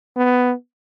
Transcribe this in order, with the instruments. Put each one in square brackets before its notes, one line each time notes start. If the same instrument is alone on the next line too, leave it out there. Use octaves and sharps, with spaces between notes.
[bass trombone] B3